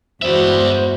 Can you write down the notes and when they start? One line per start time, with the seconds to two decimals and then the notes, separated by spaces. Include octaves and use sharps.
0.22 E2 G2 G#3 F#4 C5 D5 E5 B5